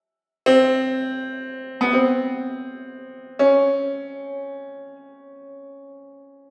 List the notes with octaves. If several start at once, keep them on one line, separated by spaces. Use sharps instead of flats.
C4
B3
C4
C#4